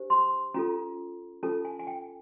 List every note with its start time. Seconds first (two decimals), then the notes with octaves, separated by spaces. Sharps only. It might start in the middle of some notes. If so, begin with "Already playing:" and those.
Already playing: D4 G4 C5
0.10 C6
0.54 C#4 F4 A4 A#5
1.43 C#4 F4 A4 A5
1.65 G#5
1.79 G#5
1.87 G5